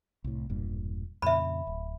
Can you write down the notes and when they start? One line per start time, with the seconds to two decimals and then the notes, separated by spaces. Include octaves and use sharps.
0.24 C2 A2
0.50 E1 G2 A#2
1.22 F2 A#2 C#3 E5 B5
1.67 D1